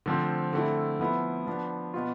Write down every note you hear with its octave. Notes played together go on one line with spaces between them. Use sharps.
D3 F3 A3 C4
D3 A3 C4 E4
F3 B3 E4
F3 B3 D4
B2 B3 F4